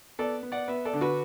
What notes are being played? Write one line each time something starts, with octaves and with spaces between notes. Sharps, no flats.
B3 A4 D5
B3
D5 F#5
B3 B4 E5
A4 D5
D3
F#4 B4